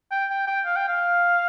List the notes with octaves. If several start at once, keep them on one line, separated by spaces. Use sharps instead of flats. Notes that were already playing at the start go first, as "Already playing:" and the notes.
G5
G5
G5
F5
G5
F5